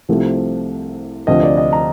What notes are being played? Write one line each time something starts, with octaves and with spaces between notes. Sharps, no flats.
C2 C3 F3 A3
D2 C3 F3 D#5
D5
D#5
A#5